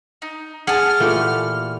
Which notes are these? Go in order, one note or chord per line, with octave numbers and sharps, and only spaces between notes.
D#4
G#4 F#5 A5 F6
A#2 E3 A3 G4